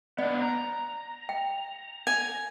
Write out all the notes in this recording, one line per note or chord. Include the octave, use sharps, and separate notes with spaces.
B3 D4 D5
A#5
G5
G#5